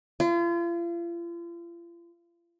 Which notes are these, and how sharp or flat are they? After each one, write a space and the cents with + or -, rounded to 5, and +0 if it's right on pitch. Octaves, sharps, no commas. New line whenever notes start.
F4 -40